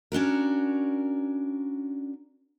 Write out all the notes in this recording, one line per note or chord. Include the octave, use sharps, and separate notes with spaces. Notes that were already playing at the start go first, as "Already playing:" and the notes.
C#4 D4 F#4 A#4